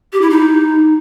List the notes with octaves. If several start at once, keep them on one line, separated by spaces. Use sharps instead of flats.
G4
E4
D#4